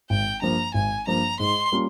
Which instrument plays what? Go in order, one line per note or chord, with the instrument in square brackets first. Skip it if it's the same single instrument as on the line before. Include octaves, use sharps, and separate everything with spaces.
[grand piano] G#1 [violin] G5
[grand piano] G2 F3 A#3 [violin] A#5
[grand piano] G#1 [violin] G#5
[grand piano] G2 F3 A#3 [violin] A#5
[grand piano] G#2 [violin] C6
[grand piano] G3 A#3 C#4 F4